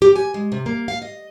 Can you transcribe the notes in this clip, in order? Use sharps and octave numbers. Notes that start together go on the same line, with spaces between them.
G4
G#5
G#3
C3
A#3
F5
D#5